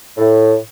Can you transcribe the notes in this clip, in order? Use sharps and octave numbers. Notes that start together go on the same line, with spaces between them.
A2